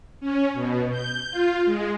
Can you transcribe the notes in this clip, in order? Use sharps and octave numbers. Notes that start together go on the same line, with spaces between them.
C#4
B2
G6
F4
G#3